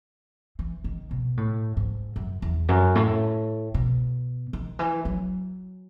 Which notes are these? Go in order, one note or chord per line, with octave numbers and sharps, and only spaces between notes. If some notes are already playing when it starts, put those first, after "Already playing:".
E3
D#3
B2
A2
G#2
F#2
E2
F#2
A2
B2
D#3
E3
F#3